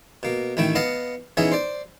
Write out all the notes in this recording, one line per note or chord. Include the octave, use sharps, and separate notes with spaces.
B2 A#3
A1 D#3 A3 E4 G5
B3 D#5 F5 F#5 A5
E3 B3 C#4 D#4 G#4 E5
C5 D5